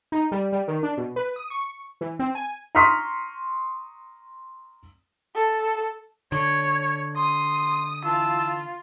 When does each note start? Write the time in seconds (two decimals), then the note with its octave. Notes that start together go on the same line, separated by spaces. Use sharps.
0.12 D#4
0.32 G3
0.52 G3
0.68 D#3
0.83 D4
0.97 B2
1.16 B4
1.36 D#6
1.50 C#6
2.01 E3
2.19 C4
2.35 G#5
2.75 A#5 C6 C#6 D#6 F6 B6
5.36 A4
6.32 D3 C#5
7.17 C6 D#6
8.04 E3 F4 A5 E6